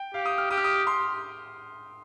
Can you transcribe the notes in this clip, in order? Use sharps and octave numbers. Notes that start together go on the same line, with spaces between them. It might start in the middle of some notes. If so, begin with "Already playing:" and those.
Already playing: G5
G4 F5
D#6
F6
G4 D#6
F6
D#6
C6